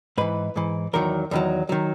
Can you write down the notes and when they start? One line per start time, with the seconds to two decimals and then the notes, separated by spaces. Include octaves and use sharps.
0.18 G#2 E3 B4
0.56 G#2 E3
0.93 E2 D#3 F#3 A#4
1.31 E2 D#3 F#3
1.69 D#3 F#3